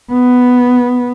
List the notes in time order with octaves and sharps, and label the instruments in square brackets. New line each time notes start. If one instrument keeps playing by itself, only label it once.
[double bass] B3